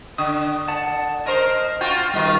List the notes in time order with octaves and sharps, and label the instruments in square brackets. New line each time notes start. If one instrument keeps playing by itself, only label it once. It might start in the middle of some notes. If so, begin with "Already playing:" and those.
[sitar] D3 [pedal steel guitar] D#6
[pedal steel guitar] D5 F#5 A5
[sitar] A#4 C5 [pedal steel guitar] D#5
[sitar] F4 F#4 [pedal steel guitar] G5 C#6
[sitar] B2 D#3 F4 [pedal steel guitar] G3 D#4